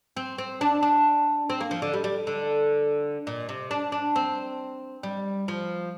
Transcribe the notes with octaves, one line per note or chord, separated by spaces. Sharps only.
C4
C4
D4
D4
C4
A#3
F3
D3
G3
G3
D3
A#2
C3
D4
D4
C4
G3
F3